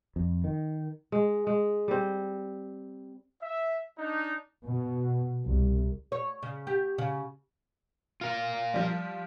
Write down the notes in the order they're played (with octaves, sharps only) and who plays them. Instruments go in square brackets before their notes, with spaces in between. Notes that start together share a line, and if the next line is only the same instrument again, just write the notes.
[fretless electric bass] F2
D#3
[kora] G#3
G#3
G3 C4
[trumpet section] E5
D4 D#4
[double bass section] B2
C2
[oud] C#5
C#3
G4
C#3
[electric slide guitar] F4 A#4
[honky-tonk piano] F3 G3